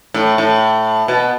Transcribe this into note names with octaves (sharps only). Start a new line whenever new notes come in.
A2
A2
B2